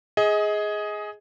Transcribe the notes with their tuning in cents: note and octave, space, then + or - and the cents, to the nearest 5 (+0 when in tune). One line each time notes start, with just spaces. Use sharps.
G#4 +5 D#5 +25